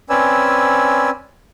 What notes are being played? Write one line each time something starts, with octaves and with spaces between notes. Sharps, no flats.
C4 C#4 B4 D5 G#5 E6